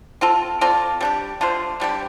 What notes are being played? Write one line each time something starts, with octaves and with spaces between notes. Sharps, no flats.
C4 F4 A4
C4 F4 A4 D5
G3 D4 G4
D3 A3 F4 C5
D3 G3 D4 G4